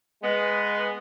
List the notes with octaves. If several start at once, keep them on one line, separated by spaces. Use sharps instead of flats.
G#3 B3